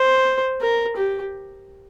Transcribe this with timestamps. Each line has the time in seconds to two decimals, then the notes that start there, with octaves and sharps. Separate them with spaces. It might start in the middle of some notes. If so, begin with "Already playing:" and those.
Already playing: C5
0.61 A#4
0.96 G4